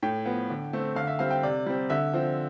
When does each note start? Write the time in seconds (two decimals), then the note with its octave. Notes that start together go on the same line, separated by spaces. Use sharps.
0.03 A2 G5
0.26 F3 B3
0.50 D3
0.73 A3 C4
0.96 D3 F5
1.07 E5
1.19 G3 C4 F5
1.31 G5
1.43 C3 D5
1.66 G3 C4
1.90 D3 E5
2.13 F3 C4